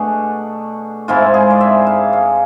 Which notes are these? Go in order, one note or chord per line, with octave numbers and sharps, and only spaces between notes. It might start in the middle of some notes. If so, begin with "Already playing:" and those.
Already playing: B2 A3 D4 G#4
G#2 G#3 C4 E4 F4
G#4
D5
E5
F5
F5